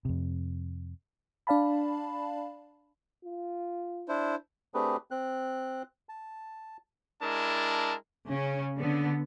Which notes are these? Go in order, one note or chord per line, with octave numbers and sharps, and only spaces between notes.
F2 C3
D4 D5 F5 A5 B5
F4
D4 E4 C5
A3 C4 D4 G4 G#4 B4
C4 F#6
A5
G#3 D4 E4 A#4 A5
C#3 C#4
D3 B3